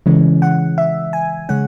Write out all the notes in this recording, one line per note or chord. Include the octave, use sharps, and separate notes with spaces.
C#3 E3 G#3 C#4
F#5
E5
G#5
C#3 G#3 C#4 F#5